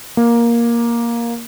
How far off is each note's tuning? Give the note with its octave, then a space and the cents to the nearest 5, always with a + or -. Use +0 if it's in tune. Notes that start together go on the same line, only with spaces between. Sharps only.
A#3 +10